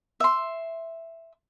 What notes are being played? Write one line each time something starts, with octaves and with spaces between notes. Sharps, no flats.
E5 C6